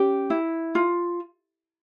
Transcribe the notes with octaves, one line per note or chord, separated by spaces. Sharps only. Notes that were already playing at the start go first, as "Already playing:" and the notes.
Already playing: C#4 G4
E4
F4